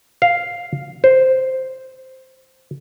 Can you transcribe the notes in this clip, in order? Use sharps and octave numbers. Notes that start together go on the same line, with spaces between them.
F5
C5